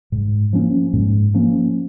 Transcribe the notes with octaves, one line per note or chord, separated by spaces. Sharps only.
G#2
F3 A#3 C#4
G#2
F3 A#3 C#4